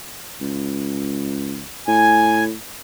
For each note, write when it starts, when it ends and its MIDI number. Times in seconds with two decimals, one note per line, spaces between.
0.41 1.63 37
1.88 2.53 45
1.88 2.44 80